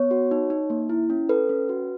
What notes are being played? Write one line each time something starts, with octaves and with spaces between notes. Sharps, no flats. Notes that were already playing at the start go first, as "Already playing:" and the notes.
Already playing: B3 C#5
F#4
D#4
D#4
A#3
E4
C#4
A4 B4
C#4
F#4